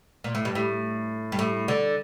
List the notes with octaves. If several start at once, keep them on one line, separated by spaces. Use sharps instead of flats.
A#2
A2
G2
A2
G2
A2
D3